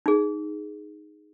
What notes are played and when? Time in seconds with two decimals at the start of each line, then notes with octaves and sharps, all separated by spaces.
0.06 D#4 G#4